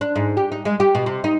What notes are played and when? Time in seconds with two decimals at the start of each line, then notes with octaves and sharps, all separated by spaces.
0.01 D4
0.16 G#2
0.37 G4
0.52 D#4
0.65 G#3
0.80 G4
0.95 B2
1.06 C3
1.24 D#4